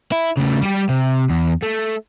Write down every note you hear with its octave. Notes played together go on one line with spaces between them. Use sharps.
E4
C#3 A3
G3 G4
C3
E2
A3